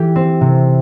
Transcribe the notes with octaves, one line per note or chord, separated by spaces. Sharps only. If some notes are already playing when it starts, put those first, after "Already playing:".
Already playing: E3 G4
C4
C3